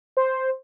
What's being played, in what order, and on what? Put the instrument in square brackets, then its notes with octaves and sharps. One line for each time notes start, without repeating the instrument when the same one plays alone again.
[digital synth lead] C5